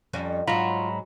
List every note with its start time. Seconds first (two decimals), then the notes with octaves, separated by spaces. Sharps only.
0.13 F2 G3 C#4
0.48 G#2 F#3 F4 A#5 B5